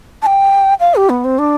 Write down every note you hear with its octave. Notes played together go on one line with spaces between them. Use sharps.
A5
G5
F5
G4
B3
C4
D4